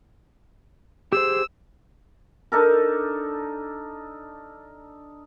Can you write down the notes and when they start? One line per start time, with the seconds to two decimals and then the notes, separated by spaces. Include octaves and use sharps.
1.12 G4 G#4 C5 E6
2.52 D4 D#4 A4 A#4